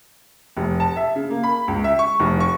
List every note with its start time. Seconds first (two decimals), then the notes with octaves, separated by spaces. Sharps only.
0.57 F1
0.80 A5
0.96 E5
1.16 C#3
1.30 A#3
1.43 B5
1.68 C#2
1.84 E5
1.99 C#6
2.19 F1
2.40 C#6